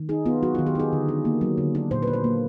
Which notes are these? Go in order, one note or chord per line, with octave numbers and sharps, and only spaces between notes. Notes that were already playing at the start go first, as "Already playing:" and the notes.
Already playing: D#3
D#4 G#4
B3 F4
F#3 F#4
D#3 F4
G4
D#4 G#4
D3
D4
A#3
F#3
D3
D4
A#2 C5
D4 B4
C5
A#3